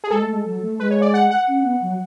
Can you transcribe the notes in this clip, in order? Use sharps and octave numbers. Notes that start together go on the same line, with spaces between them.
G#4
G#3 A4
A3
G#3
F#3
A3
G#3 B4
C#5
D5
F#5
F#5
C#4
B3
F#3